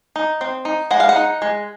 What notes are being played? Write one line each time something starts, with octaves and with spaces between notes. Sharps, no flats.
D#4
C4
D#4
G#3 F#5
F5
F#5
D#4
G#3